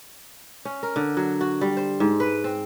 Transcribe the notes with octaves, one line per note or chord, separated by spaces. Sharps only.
C#4
A#4
D3
F#3
F#4
G3
C5
G#2
B4
C4